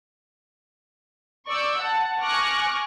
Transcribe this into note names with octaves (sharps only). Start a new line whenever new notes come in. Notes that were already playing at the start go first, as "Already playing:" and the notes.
D5 C#6 E6 G6
F#5 A5
G#5 C#6 D6 F6 F#6 A#6